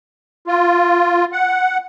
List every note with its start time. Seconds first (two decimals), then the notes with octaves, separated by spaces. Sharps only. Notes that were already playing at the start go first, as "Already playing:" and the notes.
0.47 F4
1.33 F#5